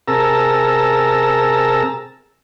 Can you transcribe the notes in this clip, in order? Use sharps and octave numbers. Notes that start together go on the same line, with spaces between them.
C3 G#4 A#4 A5 A#5 E6